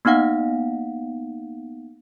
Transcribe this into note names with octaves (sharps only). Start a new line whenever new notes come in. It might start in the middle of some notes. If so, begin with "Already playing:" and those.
A#3 B3 D#4 F5 F#5